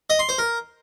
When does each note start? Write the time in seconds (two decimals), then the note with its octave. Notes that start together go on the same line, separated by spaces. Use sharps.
0.10 D#5
0.19 C6
0.29 C5
0.38 A#4